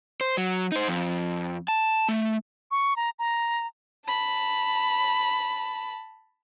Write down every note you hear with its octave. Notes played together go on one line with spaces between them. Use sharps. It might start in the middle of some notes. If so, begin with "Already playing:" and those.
C5
F#3
D#4 C5
F2
A5
A3
C#6
A#5
A#5
A5 B5